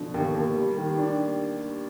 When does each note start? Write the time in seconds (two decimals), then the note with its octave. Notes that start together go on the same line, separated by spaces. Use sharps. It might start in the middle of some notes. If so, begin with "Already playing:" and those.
Already playing: B2 D3 F3
0.14 D#2
0.35 D#2
0.56 G3
0.77 D#3
0.98 D4